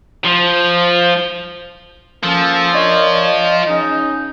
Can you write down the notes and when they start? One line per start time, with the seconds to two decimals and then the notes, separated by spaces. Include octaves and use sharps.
0.25 F3
2.23 F3 A#3 C#4 A4
2.74 D4 A#4 C#5 D#5
3.67 C#3 C#4 D#4